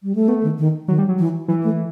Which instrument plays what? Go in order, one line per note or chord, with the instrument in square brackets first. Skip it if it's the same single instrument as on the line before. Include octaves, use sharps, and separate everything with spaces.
[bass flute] G3
A3
[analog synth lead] A3 [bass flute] B3
[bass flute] D#3
D#3
[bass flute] D#3 [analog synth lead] F#3
[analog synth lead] G3
F#3
[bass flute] E3
[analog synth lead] E3 [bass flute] F#3
[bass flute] A3